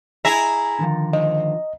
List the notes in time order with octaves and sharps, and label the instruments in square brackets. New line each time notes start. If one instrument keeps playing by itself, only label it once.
[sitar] E4 G#4 E5 [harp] A#5
[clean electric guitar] D3 D#3 F3
[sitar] G#2 [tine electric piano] D#5